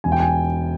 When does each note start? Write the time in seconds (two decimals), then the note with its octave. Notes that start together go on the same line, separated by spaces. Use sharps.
0.04 E1 G#5
0.12 G5
0.20 G#5